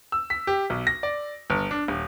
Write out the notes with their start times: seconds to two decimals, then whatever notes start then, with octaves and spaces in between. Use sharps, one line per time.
0.12 E6
0.30 B6
0.47 G4
0.70 B1
0.87 A#6
1.03 D5
1.50 G1
1.71 D4
1.88 D#1